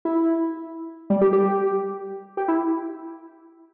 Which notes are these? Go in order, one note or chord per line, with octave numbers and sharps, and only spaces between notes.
E4
G3
G4
G4
G4
E4